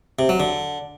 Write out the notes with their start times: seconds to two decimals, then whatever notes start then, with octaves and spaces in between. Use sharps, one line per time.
0.19 C3
0.29 F#3
0.40 D3